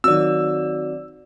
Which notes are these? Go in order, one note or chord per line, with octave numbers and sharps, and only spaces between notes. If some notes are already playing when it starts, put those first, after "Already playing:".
D#3 F#3 C4 D5 E6